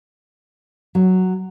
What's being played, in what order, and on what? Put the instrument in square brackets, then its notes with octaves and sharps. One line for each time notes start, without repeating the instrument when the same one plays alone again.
[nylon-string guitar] F#3